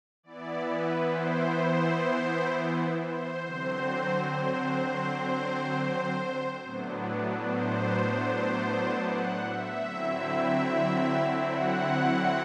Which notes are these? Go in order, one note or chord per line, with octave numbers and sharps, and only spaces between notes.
E3 B3 E4 D5
B4
C5
C5
D3 F#3 C4 C5
A2 F#3 B3 D4
C5
F#5
E5
D3 F#3 C4 E4
F#5